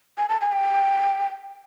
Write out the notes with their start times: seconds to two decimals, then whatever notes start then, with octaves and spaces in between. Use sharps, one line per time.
0.18 G#5
0.29 A5
0.41 G#5
0.52 G5